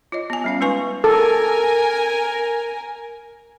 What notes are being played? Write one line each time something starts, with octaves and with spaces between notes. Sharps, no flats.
F4 C#5 D#5
B3 G#5
G3 C#4 F5
G#3 D#4 B4 G#5 C#6
A4 A#4 G#5